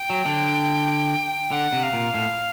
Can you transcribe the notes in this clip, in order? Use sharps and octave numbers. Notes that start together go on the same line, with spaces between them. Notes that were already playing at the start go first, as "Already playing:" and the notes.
Already playing: G5
F#3
D3
D3 F#5
C3
F5
A#2
A2